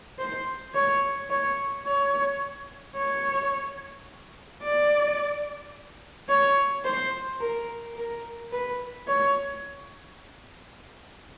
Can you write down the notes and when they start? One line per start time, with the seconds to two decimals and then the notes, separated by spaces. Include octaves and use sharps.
0.19 C5
0.75 C#5
1.30 C#5
1.85 C#5
2.96 C#5
4.63 D5
6.29 C#5
6.85 C5
7.40 A#4
7.96 A#4
8.52 B4
9.07 C#5